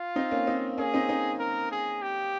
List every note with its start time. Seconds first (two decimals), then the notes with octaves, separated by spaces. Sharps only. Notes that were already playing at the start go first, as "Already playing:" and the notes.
Already playing: F4
0.16 C4 D#4
0.31 A#3 C#4
0.47 C4 D#4
0.78 A#3 C#4 G#4
0.94 C4 D#4
1.09 C4 D#4
1.40 A#4
1.71 G#4
2.02 G4